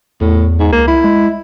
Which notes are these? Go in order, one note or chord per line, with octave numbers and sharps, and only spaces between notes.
E2 A2
G#2
C#2 A#3
E4
G#3